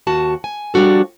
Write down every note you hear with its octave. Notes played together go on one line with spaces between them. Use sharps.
D#2 F#4 A5
G#5
F3 G3 D4 F#4 A4